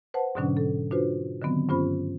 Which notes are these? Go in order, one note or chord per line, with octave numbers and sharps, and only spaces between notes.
B4 C5 F#5 A5
G#2 B2 D3 F#3 C#4 D4
A4
D4 F4 F#4 B4 C5
D3 D#3 F#3 B3 C4
G2 C#4 F4 C5 B5